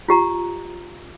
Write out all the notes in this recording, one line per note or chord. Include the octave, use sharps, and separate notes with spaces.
F4 G4 A#5